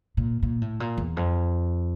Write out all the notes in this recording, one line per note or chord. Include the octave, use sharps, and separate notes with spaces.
A#2
A#2
A2
A#2
E2
F2